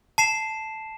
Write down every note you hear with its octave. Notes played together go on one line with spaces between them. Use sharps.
A5 C7 E7